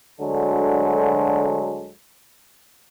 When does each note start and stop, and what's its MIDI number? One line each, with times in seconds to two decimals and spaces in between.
0.19 1.91 38
0.19 1.91 50
0.19 1.91 54
0.19 1.91 56
0.19 1.91 69